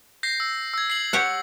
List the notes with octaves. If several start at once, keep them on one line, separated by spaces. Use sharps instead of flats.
G6 A#6 C7
E6
E6 G#6
C7 F#7
G4 C#5 F#5